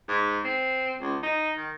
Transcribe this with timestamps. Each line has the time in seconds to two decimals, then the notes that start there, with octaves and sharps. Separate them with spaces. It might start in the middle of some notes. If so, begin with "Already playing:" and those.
0.09 G#2
0.44 C4
1.01 C#2
1.23 D#4
1.57 D#3